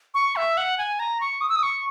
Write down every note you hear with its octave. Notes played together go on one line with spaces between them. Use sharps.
C#6
E5
F#5
G#5
A#5
C#6
D#6
E6
D#6
C#6